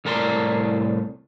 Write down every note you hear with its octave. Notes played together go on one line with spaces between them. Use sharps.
C2 A2 A#4 D5 C6